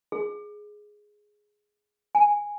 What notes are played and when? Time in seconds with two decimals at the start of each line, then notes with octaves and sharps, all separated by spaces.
0.12 G#4
2.15 G#5